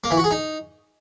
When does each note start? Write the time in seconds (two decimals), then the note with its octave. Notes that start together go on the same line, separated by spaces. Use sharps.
0.04 A#3
0.11 E3
0.17 F#4
0.24 G#4
0.31 D#4